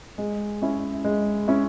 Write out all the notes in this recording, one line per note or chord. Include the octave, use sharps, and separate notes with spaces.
G#3
C#4 E4
G#3
C#4 E4